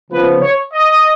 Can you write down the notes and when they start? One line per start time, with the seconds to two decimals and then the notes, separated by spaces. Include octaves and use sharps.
0.11 C#3 F3 B3 B4
0.41 C#5
0.72 D#5